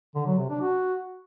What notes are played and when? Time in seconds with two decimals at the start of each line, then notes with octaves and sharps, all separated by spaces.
0.15 D3
0.27 F#3
0.38 C3
0.50 D4
0.62 F#4